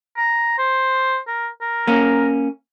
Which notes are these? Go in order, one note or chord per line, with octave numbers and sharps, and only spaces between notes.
A#5
C5
A#4
A#4
A#3 C#4